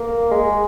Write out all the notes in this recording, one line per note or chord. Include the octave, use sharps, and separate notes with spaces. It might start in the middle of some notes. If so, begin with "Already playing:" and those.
Already playing: A#3
G#3